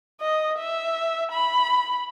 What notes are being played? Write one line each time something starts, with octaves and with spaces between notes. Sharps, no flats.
D#5
E5
B5